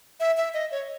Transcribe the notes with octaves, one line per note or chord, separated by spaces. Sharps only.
E5
E5
D#5
C#5